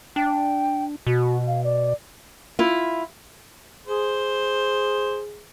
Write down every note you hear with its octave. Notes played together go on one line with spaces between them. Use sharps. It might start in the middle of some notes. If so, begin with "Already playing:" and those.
D4 G5
B2 F#4
F5
D5
E4 F4
G#4 C5